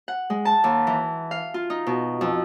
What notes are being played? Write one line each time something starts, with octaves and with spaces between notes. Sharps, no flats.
F#5
G#3
A5
D#2
E3
F5
F4
D#4
B2
F2